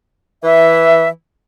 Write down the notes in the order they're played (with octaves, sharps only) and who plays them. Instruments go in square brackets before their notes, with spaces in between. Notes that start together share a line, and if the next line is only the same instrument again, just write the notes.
[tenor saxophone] E3 [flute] E5